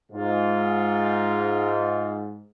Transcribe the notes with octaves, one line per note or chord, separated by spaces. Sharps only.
G#2 F4